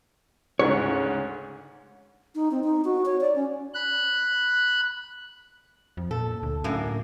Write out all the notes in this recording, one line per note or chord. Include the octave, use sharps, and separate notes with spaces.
D2 G#2 C#3 C#5
D#4
C4
D#4
F#4
C#5
D5
C#4
B5 F#6
F2
A#2 A4
D2
F#2 A2 D3 A#3